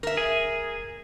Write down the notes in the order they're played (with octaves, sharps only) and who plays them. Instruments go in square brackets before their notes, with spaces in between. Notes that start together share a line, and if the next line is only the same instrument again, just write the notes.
[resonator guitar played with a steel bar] A#4 E5
[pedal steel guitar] G#4